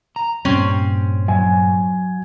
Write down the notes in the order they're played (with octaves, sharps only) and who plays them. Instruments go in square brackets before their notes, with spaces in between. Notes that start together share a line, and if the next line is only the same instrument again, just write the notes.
[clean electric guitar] A#5
[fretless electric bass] G2 A#2 G3 [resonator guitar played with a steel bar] C4 C#4
[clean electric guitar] F#3 [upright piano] G#5